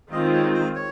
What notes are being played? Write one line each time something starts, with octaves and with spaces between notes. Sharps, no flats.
D#3 G#3 C4 F4 D#5
C#5
C5
C#5